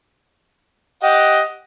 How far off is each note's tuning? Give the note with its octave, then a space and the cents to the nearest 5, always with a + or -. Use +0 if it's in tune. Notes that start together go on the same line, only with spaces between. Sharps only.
G4 +0 D#5 +10 F#5 +0